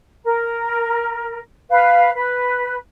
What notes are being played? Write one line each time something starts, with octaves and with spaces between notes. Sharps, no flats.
A#4
B4 F5
B4